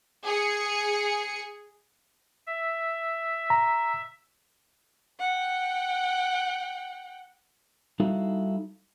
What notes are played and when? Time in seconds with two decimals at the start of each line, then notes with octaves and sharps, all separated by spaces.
0.24 G#4 C#7
2.47 E5
3.50 A#5
5.19 F#5 G5
8.00 G3 D#4 E4 F#4 A4 F5